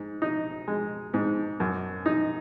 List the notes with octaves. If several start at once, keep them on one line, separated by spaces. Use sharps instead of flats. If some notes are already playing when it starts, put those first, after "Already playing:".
Already playing: G#2
D#4
G#3
G#2
F#2
D#4